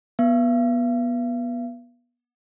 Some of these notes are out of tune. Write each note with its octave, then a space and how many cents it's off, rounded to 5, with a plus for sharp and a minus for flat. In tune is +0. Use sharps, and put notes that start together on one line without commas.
B3 -25 F5 -45